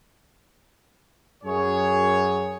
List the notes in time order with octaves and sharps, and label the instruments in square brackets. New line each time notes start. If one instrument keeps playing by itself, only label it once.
[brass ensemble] F#2 G#4 C#5